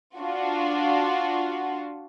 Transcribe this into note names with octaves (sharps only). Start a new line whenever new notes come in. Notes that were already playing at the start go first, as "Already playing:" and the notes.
D4 F4 F#4